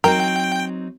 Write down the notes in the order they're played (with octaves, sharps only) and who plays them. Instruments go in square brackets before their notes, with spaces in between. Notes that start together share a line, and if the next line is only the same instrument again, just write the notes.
[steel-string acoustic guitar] F#3 C4 D#4 [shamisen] A#4 [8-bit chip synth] G5